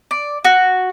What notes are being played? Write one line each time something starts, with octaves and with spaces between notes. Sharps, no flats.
D5
F#4